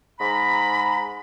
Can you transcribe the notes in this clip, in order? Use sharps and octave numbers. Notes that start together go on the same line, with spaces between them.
G#2 A#5 B5